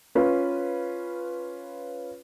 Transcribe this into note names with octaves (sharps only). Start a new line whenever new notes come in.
C#4 F4 B4